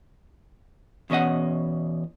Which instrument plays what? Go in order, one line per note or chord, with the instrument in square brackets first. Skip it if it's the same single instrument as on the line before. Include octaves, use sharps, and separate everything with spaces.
[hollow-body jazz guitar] E2 B2 C#4 D#5 F#5